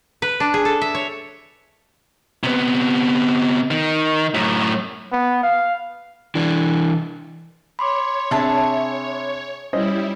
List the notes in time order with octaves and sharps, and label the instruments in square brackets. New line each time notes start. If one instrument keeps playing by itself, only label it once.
[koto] B4
D4
G#4
A4
E5
C#5
[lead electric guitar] C3 B3
D#3
F#2 A2
[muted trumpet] B3
F5
[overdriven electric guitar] E3 D4
[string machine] C#5 [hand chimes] B5 C6 D6
[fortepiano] C3 D4 [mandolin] G#4 E5 A5
[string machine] G3 E4 [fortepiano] C#4 C5 D#5